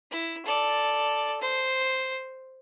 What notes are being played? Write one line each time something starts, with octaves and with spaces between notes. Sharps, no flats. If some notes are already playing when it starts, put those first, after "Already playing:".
E4
A4 D5
C5